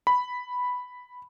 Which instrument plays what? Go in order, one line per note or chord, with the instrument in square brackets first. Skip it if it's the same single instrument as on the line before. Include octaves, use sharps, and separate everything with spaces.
[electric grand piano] B5